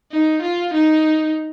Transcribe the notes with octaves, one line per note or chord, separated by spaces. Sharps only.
D#4
F4
D#4